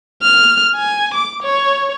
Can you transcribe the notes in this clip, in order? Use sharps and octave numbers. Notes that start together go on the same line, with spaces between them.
F6
G#5
D6
C#5